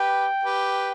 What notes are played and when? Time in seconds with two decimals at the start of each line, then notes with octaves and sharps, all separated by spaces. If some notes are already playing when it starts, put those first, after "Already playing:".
Already playing: G4 B4 G5
0.44 G4 B4